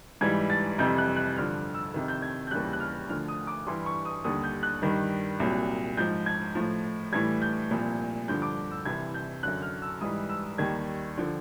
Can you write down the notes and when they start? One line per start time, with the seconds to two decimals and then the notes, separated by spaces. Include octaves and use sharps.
0.21 G#2 E3 G3 G#6
0.50 A6
0.78 F2 C3 E3 G3 G6
0.98 F#6
1.16 F#6
1.36 G2 D3 F3 F6
1.74 E6
1.94 F2 C3 D#3
2.08 G6
2.22 G#6
2.47 G6
2.51 D#2 C#3 E3 G3 F#6
2.73 F#6
2.80 F6
3.09 D2 D3 F3 F6
3.28 D#6
3.47 D6
3.67 G2 E3 G3 C6
3.86 C#6
4.05 D#6
4.24 D#2 D3 G3 D#6
4.44 G6
4.63 F#6
4.82 G2 D#3 G3
5.40 C2 A#2 F#3
5.97 G#2 F3 G6
6.26 G#6
6.55 A2 F3
7.12 A2 E3 G3 G#6
7.42 G6
7.70 C2 A#2 F3
8.28 G2 D3 F3 G6
8.42 D6
8.71 E6
8.85 C2 C3 E3 G#6
9.14 G6
9.43 F#2 D3 F#3 F#6
9.62 F6
9.82 E6
10.01 G#2 E3 G3 D#6
10.29 E6
10.58 D#2 D#3 G3 G#6
11.18 D3 F3